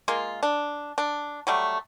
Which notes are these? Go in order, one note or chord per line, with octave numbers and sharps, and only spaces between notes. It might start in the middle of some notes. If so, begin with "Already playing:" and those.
G#3 A#3 F4
D4
D4
F#3 G3 A3